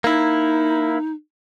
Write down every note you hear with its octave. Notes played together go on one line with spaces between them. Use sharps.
A#3 D#4 E4